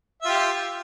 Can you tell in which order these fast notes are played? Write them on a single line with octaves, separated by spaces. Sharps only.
E5 F4 G4